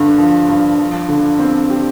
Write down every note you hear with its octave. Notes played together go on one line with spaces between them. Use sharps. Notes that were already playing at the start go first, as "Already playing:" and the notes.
Already playing: G2 D3
F3
G2
F3
D3
C4
G4